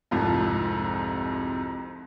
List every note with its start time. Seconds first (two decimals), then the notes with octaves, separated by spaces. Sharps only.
0.11 C2 F2 G#2 F3